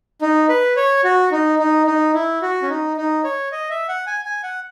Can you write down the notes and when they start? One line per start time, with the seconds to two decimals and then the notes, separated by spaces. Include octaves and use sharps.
0.22 D#4
0.49 B4
0.76 C#5
1.04 F#4
1.32 D#4
1.59 D#4
1.87 D#4
2.14 E4
2.42 F#4
2.62 C#4
2.69 D#4
2.97 D#4
3.24 C#5
3.52 D#5
3.70 E5
3.88 F#5
4.07 G#5
4.25 G#5
4.43 F#5